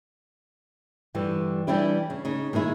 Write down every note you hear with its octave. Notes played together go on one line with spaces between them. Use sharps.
G2 D3 E3 G3
E3 G3 D4 E4 G4
C#3
C#3 D#4
A#2 D#3 G#3 E4